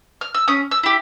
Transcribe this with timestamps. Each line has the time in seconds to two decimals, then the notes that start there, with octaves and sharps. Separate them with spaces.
0.21 F6
0.34 E6
0.48 C#4 D#6
0.71 E6
0.83 E4 G4